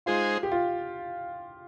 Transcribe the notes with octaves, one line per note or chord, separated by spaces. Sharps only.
G#3 D#4 F4 G#4 C5
G4
F4